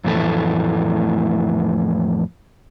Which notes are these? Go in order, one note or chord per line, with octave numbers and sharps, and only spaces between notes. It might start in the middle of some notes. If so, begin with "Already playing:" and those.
F2 A2 E3 A3